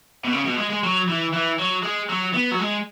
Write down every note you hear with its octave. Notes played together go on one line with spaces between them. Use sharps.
B2
C#3
B2
G#3
G#3
F#3
E3
E3
F#3
G#3
F#3
B3
F#3
G#3